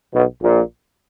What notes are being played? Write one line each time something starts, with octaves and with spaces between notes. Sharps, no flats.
B1 B2
A#1 A#2